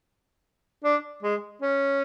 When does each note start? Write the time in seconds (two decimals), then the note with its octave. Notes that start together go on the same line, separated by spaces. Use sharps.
0.84 D4
1.23 G#3
1.62 C#4